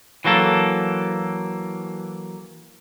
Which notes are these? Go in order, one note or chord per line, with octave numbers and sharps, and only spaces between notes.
E3 F#3 A#3 A4